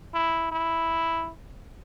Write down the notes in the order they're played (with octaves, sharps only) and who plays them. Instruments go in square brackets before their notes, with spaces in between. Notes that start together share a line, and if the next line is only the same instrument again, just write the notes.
[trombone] E4
E4